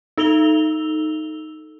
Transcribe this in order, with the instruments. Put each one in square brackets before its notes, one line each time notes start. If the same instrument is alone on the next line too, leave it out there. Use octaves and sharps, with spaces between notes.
[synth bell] D#4 A4 E6 F7 G7